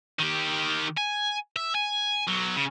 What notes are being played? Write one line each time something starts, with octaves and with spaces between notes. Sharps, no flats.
D#3 G4
G#5
E5
G#5
B1 F#3
C#3